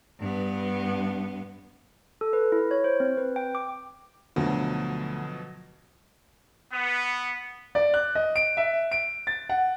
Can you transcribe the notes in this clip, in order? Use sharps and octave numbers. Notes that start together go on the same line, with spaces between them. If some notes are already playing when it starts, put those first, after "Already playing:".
G2 B3
A4
B4
E4
C#5
C5
C4
B4
G5
D6
D2 B2 F3 F#3
B3
D5
F#6
D#5
D7
E5
D7
A6
F#5